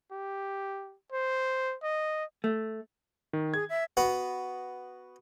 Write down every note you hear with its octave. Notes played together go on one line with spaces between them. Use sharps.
G4
C5
D#5
A3
D#3
G#4 G#6
E5
B3 F#4 F#5